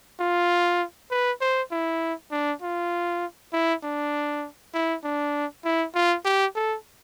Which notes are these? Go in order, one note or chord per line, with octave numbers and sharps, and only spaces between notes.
F4
B4
C5
E4
D4
F4
E4
D4
E4
D4
E4
F4
G4
A4